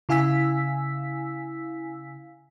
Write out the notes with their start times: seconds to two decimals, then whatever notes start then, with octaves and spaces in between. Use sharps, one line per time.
0.09 C#3 E4 F5 G#5 E6 B6